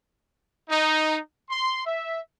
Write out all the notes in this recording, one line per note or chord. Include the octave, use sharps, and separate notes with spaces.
D#4
C6
E5